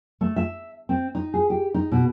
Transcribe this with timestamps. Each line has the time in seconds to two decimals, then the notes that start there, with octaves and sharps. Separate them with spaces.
0.21 A3
0.36 E5
0.89 C4
1.15 D#4
1.34 G#4
1.50 G4
1.74 D#4
1.92 B2